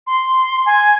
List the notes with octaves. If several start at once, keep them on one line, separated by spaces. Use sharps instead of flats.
C6
G#5